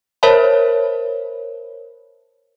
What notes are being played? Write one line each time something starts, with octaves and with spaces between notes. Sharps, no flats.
A#4 C5 C#5 E5 A5 B5